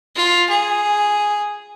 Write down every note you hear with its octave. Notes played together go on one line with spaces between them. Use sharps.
F4
G#4